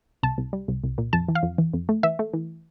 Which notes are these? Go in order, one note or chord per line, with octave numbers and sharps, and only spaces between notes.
C2 A5
C2
G3
C2
C2
A#2
F2 A5
E3
F5
F2
E3
F2
A3
E3 E5
A3
E3